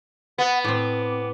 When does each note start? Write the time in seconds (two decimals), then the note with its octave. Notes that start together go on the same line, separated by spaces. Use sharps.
0.38 B3 F#5
0.64 A2 C4 D6